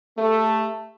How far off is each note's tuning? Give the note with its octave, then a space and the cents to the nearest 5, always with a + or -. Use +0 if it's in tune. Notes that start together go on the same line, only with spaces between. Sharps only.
A3 +5 G4 +30